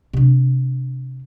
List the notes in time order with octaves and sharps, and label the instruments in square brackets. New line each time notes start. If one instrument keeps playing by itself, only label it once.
[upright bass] C3 D4